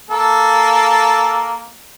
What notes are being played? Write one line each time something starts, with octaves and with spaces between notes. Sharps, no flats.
A#3 A4